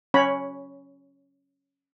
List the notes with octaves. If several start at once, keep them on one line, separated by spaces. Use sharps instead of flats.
C#4 C#5 B5